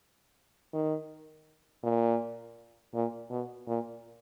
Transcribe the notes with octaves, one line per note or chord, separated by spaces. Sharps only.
D#3
A#2
A#2
B2
A#2